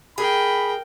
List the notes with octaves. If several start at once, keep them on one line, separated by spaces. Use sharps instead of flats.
G#4 A#4 G5 B5